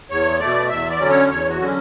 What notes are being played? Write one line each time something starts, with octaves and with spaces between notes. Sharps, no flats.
E2 C#5
B2 A3 D5
E2 E5
D5
D3 F#3 C#4
C#5
E2 C#5
F#4
D3 F#3 C#4